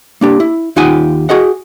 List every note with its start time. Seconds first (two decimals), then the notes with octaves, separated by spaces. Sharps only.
0.21 A#3 D4 G4
0.40 E4
0.76 D#2 D#4 F4 G4 F#5 G#5
1.29 F#4 G#4 D#5 F#5